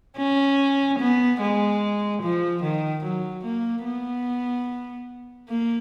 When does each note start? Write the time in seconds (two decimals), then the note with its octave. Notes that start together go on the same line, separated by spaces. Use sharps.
0.17 C#4
0.99 B3
1.40 G#3
2.22 F3
2.63 D#3
3.03 F#3
3.44 A#3
3.85 B3
5.49 A#3